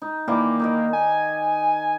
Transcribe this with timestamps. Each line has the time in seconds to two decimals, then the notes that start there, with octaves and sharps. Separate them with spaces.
0.02 D#4
0.28 D#3 E3 A#3 D5
0.60 D#4 A#4 D#5
0.93 G#5